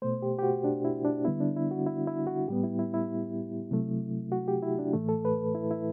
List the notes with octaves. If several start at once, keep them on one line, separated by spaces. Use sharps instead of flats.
B2 A3 C5
G4
G4
F#4
D4
E4
D4
D3 G3 B3 E4
D4
E4
F#4
E4
E4
F#4
A2 G3 B3 G4
E4
E4
E4
C3 F#3 A3
F#4
G4
E4
D4
A2 E3 A3
A4
B4
E4
E4